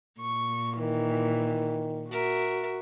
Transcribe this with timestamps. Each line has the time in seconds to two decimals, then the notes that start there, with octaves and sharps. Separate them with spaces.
0.21 A#2 C#6
0.79 D#3 E3
2.11 F#4 A#4 E5